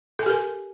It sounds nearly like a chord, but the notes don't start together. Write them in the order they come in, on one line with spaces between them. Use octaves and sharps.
A4 G#5 G4 A#4